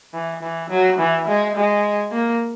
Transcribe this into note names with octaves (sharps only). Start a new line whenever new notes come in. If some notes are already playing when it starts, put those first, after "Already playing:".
E3
E3
F#3
E3
G#3
G#3
A#3